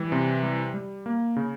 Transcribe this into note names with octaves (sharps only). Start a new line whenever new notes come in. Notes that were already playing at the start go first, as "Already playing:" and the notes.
Already playing: E3 G3
C3
G3
G3
A#3
C#3